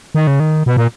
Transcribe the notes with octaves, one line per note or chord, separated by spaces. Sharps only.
D#3
C#3
D#3
B2
A#2